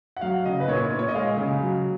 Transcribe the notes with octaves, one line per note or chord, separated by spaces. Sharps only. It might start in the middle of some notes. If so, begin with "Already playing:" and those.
F#5
F#3 F5
C#3 D#5
B4
A#2 C#5
C#5
A#2
C#5
D#5
G#3 F5
C#3
F#3